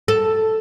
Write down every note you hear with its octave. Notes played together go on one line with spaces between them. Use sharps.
A4